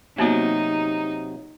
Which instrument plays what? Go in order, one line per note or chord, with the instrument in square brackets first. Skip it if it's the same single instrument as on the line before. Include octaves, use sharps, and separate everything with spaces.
[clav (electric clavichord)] C3 F#3 [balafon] A#3 B3 F#4 [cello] D#4